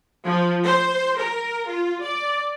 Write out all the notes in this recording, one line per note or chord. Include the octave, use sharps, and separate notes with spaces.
F3
C5
A#4
F4
D5